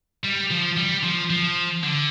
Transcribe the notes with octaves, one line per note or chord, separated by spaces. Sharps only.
G3
F3
G3
F3
F3
D3